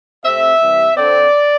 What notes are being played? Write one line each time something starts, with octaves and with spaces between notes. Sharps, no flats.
C3 A3 C4 E5
C3 E3 G3
D3 C4 D5